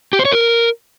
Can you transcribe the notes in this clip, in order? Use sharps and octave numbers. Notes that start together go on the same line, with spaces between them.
G4
C5
C#5
A#4